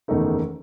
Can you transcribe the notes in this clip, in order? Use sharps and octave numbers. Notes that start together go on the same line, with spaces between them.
F#1 E2 D#3 A3 D#4